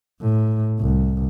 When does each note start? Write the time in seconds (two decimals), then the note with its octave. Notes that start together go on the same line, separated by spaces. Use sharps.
0.21 A2
0.79 C2